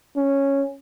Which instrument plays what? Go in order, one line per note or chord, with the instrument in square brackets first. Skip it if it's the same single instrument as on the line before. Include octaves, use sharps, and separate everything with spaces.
[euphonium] C#4